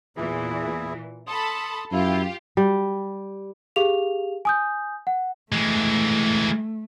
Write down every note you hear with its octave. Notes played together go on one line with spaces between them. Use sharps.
E2 A#2 E3 E4 G#4
A4 A5 B5 C6 D#6
F#2 E4 F4 G4
G3
G4 G#4 F5 F7
G#5 D#6 G6
F#5
E3 G#3 A3